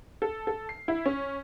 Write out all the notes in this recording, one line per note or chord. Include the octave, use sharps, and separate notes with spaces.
A4
A4
C7
E4
C#4